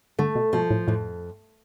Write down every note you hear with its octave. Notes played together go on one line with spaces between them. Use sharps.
D3 A3
B2
B2 F3
A2
F2 A2